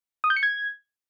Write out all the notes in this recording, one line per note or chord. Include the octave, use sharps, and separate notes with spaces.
D#6
G6
C#7
G#6